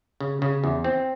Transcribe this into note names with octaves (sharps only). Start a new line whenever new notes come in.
C#3
C#3
E2
C4